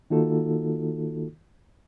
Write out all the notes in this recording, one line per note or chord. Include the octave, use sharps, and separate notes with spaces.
D#3 A#3 D#4 F4 F#4 A4